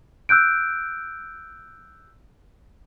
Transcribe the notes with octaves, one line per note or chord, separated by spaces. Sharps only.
E6 F#6 G6 D7